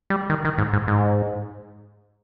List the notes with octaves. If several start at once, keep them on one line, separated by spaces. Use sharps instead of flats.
G3
D#3
D#3
G#2
G#2
G#2